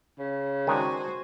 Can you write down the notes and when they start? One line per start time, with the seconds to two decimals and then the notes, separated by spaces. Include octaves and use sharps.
0.19 C#3
0.67 D#3 G#3 D4 F#4 C5 G#5